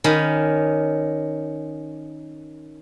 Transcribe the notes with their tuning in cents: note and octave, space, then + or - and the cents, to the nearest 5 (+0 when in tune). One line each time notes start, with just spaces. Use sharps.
D#3 -5 C#4 +0 B5 +0